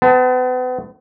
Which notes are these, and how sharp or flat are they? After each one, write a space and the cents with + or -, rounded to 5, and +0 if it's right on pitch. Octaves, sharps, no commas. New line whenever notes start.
B3 +40 A5 +0